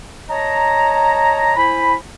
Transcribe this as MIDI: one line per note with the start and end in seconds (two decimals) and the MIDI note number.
0.30 1.55 73
0.30 1.55 75
0.30 1.55 81
0.30 1.55 82
1.56 1.94 64
1.56 1.94 72
1.56 1.94 80
1.56 1.94 83